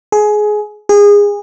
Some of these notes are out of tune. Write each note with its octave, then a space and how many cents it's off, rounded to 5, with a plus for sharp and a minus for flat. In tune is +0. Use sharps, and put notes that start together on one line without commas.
G#4 +20
G#4 -25